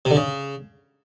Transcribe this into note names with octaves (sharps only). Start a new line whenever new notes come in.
C3
D3
C#3